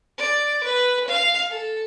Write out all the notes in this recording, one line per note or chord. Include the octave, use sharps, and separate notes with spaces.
D5
B4
F5
A4